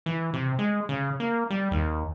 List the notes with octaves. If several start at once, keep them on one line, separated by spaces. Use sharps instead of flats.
E3
C3
G#3
C#3
A#3
G3
D#2